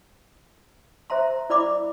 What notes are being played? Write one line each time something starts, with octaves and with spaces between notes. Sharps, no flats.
C5 E5 A#5 C6
E4 D5 B5 D6